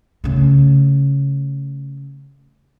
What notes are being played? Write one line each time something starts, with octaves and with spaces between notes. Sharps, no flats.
C#3 A3